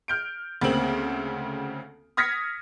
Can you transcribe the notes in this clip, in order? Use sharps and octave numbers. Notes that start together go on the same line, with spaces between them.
F6 G6 D7
D2 C#3 A#3 C4 F#7
D#6 F6 G#6 A#6 B6 C#7